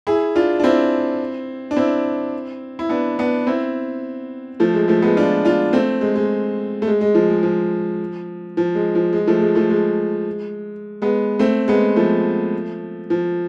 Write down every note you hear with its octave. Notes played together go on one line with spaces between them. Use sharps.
E4 G#4
D4 F4
D4
C4 E4
D4
C4 E4
E4
B3 D4
B3 D4
C4 E4
F3 A3
G#3
F3 A3
G#3 B3
D4 F4
D4 F4
A3 C4
G#3
G#3
A3
G#3
G#3
F3
G#3
F3
F3
G#3
F3
G#3
F3 A3
G#3
F3 A3
G#3
G#3 B3
A3 C4
G#3 B3
F3 A3
F3